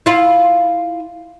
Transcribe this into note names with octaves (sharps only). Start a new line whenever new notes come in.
E4 F4